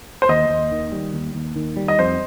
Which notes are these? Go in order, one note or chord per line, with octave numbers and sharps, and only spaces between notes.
C5
D#2 D#5
D#2
D#3
G3
D#2
D#2
D#3
G3
D#5
F2 C5